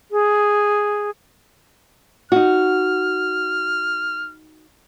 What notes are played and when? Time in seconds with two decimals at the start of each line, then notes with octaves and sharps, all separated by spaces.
0.11 G#4
2.32 D#4 F#4 F6